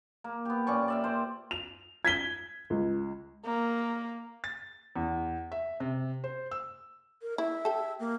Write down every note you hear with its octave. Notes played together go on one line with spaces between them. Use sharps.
A#3
B3 G4
A#2 C#4 D5 C#6
D5 E5 F5
C5 D5 G5
F7
G#6 B6 G7
C#2
A#3
A6
E2
E5
C3
C5
E6
A#4
E4 E5
G4 A4
A#3